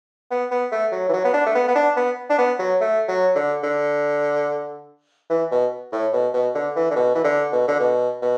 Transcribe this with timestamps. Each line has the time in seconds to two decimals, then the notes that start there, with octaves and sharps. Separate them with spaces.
0.31 B3
0.51 B3
0.72 A3
0.92 F#3
1.09 E3
1.13 F#3
1.24 B3
1.34 D4
1.46 A3
1.55 B3
1.68 B3
1.75 D4
1.96 B3
2.30 D4
2.38 B3
2.59 F#3
2.81 A3
3.08 F#3
3.35 D3
3.63 D3
5.30 E3
5.51 B2
5.93 A2
6.13 B2
6.34 B2
6.55 D3
6.76 E3
6.91 D3
6.96 B2
7.15 E3
7.24 D3
7.52 B2
7.68 D3
7.80 B2
8.22 B2